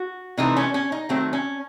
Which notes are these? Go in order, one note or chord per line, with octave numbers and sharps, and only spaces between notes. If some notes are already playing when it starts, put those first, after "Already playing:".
Already playing: F#4
C3 E3 A3 C4 D#4
C#4
C#4
D#4
D#3 F#3 A3 C4
C#4